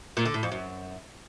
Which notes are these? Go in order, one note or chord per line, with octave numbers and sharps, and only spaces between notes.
A#2
D3
A2
F2
F#2